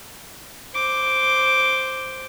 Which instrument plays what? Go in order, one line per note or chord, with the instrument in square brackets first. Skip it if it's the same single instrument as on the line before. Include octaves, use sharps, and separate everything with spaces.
[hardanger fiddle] C5 D6